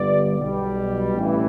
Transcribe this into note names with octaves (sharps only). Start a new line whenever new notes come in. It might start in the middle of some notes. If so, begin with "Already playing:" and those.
Already playing: G1 G2 G3 B3 D5
B1 B2 G3
A1 G2 E3